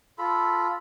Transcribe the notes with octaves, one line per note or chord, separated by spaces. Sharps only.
F4 A4 B5